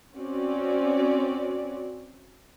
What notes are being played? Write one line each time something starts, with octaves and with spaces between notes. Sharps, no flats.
C4 C#4 F#4 D5